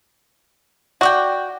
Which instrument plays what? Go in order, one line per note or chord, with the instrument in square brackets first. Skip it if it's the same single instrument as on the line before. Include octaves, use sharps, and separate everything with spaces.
[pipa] F#4 [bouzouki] D5 D#5 G5